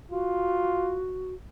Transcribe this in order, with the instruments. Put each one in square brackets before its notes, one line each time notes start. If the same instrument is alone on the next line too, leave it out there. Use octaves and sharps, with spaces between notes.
[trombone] F4 [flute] F#4